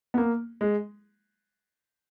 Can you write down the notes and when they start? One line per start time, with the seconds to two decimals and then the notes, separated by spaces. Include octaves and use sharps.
0.14 B3
0.18 A#3
0.61 G#3